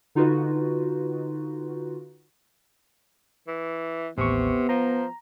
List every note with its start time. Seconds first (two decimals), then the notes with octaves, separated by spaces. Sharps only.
0.15 D3 D#4 F4 F#4 B4
3.48 E3
4.18 A1 D#2 C3 B3 C#6
4.69 F3 A#5